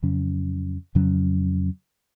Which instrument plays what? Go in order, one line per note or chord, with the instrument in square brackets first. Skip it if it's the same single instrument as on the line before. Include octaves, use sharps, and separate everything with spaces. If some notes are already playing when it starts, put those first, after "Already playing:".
[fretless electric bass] F2 C#3 F#3 C#4
F2 C#3 F#3 C#4